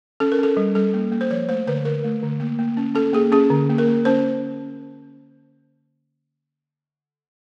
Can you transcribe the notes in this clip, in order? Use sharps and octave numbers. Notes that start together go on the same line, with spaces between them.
C#4 A4
A#4
C#4 A4
G3
G3 A4
A#3
A#3
C5
F3 C#5
A3 C5
D3 B4
D3 A#4
A3
D3
A#3
A#3
C#4
C#4 A4
A#3 G#4
C#4 G#4
D3
A#3
A#4
A#3
C#4 C5